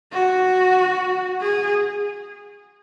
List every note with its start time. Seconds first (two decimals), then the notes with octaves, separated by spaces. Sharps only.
0.13 F#4
1.41 G#4